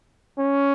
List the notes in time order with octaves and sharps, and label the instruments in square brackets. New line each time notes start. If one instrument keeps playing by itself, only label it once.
[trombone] C#4